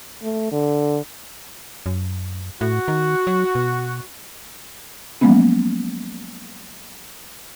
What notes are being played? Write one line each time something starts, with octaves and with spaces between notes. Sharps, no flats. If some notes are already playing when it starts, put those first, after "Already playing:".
A3
D3
F#2
A2 F#4
D#3
F#3
B2
F3 F#3 G#3 A#3 B3 C#4